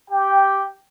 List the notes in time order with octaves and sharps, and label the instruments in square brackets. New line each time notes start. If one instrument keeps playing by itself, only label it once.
[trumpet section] G4 G5